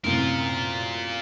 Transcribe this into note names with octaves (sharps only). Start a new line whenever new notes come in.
F#2 A2 C3 F4 A#4